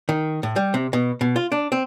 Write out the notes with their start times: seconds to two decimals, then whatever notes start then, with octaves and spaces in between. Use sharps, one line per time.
0.09 D#3
0.43 A2
0.56 G3
0.74 C3
0.93 B2
1.21 B2
1.36 F4
1.52 D4
1.72 C4